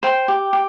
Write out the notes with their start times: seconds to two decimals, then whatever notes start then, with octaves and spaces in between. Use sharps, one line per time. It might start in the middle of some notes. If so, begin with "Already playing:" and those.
0.03 C5 G5
0.28 G4
0.53 G4